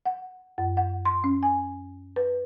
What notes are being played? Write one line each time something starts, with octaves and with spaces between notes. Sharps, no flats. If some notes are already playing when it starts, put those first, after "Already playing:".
F#5
F#2
F#5
C6
C#4
G#5
B4